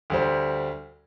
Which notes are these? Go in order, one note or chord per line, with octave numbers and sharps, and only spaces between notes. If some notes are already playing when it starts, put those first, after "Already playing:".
D2 G3 C5